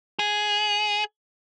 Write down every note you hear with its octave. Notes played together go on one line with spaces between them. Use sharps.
G#4